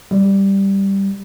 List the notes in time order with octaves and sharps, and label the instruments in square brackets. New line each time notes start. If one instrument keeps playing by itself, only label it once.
[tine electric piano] G3